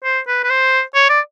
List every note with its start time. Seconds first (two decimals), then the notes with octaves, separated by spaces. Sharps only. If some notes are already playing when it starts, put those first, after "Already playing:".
0.04 C5
0.27 B4
0.44 B4
0.50 C5
0.95 C#5
1.09 D5